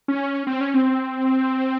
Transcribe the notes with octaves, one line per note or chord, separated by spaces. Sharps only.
C#4
C4
C#4
C4